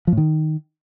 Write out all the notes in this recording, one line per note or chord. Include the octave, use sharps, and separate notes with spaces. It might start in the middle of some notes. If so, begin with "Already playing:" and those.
F3
A2
D#3